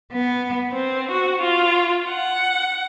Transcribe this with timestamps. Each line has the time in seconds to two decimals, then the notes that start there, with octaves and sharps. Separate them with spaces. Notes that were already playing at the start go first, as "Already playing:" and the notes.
0.11 B3
0.71 C4
1.11 F#4
1.41 F4
2.09 F#5